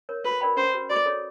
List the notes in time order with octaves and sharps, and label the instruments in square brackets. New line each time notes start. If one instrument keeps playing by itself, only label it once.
[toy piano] A#4 C#5
[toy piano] F#4 [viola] B4
[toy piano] A#4 D5 G5 B5
[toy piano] C#4 [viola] C5
[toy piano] F#4 B4
[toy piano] F#4 [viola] D5
[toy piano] A4 C#5